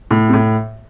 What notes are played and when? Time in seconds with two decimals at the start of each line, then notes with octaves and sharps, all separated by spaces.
0.11 A2
0.29 C3
0.33 A2